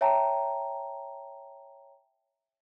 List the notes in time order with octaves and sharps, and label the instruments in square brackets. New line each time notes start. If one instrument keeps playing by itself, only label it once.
[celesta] C#5 E5 G5 A5 A#5